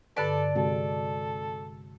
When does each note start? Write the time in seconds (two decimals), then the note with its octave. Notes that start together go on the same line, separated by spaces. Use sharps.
0.17 G2 D3 A4 B4 D5 A5
0.55 C3 G#3 F#4 A4